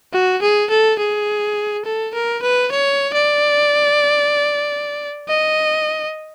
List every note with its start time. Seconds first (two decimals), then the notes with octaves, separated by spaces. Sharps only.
0.13 F#4
0.42 G#4
0.70 A4
0.99 G#4
1.85 A4
2.14 A#4
2.42 B4
2.72 C#5
3.14 D5
5.29 D#5